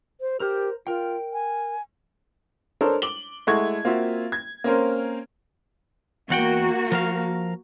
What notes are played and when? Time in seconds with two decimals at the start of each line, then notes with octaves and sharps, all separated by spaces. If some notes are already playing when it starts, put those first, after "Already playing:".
0.21 C5
0.40 G4 A#4 C5 F6
0.87 F4 A#4 G5
1.33 G#5
2.81 D4 A4 A#4 C5 C#5
3.02 D6 F#7 G7
3.47 G#3 A3 E4 F#5 C#6 G#6
3.85 A#3 C4 F4 F#4 E5
4.32 G#6
4.64 A#3 C4 C#4 A#4 C5
6.30 E2 A#3 F#4 F#5 G5
6.92 F3 A#4 F5